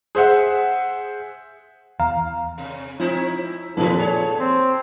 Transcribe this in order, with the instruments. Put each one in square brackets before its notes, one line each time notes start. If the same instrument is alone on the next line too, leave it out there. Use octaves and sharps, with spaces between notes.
[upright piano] G#4 C5 E5 F#5
[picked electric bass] E2 [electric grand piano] F5 [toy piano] A#5
[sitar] C3
[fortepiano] F3 [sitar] C4 D#4 E4
[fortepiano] F2 A#2 [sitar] D#3 G3 B4 [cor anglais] A4
[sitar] G#4 C#5 [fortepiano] D5
[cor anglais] C4